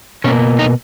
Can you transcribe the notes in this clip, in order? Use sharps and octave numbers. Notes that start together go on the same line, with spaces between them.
B2 A#3 C#4
D#4